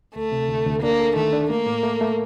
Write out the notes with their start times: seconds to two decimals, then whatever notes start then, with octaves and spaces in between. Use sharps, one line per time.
0.15 D2 A3
0.32 C3
0.49 D2
0.66 D2
0.82 A#3 D4
0.99 A4
1.16 D#3 A3
1.33 D4
1.50 A3 A#3
1.66 A2
1.83 A3
2.01 A3